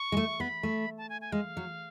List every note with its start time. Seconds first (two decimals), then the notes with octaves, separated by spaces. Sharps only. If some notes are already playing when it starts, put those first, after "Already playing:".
Already playing: C#6
0.12 G#3
0.17 A3
0.40 B3 B5
0.63 A3
0.98 A5
1.09 G#5
1.21 G#5
1.32 G#3 F5
1.57 F#3